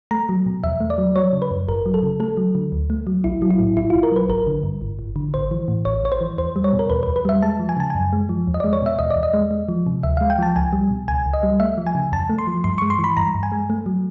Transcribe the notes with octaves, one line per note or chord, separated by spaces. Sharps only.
A3 A#5
F#3
B2
E2 E5
A3
D5
F#3
F#3 C#5
C#3
B4
F#2
G#1 A#4
F#3
A4
C#3
A3 A4
F#3
D3
D2
A3
F#3
B1 E4
F#3
E4
A2
B1 E4
B1 F4
A#4
F#3 B4
G#1 A#4
D3
G2
G#1
G#1
D3
A1 C5
E3
A2
A1 C#5
A1 C#5
C5
E3
E2 C5
G3
C#5
B2
A#4
E2 B4
B4
E2
B4
G3 E5
G#3 A5
F3
G#5
C#3 A5
F#2 G#5
G#3
F3
E2
D#5
G#3 D5
C#5
B2 E5
E2 D#5
D5
E2
D#5
G#3
G#3
F3
C3
D2 E5
G#3 F5
G5
F3 A5
C#2 G#5
G3
B2
C#2 G#5
C#2
D#5
G3
A3 E5
F3
G#5
C#3
F2 A5
A3
C6
F3
G2 C6
G#3 C#6
C6
E3
B5
G2 A#5
G2
G#5
G#3
A3
F#3